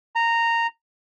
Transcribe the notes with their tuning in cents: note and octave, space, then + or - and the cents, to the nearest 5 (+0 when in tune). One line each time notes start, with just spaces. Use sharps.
A#5 -10